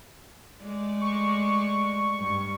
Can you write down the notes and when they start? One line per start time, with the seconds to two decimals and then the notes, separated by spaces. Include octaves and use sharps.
0.63 G#3 A3 D5
1.01 C#6
2.19 G2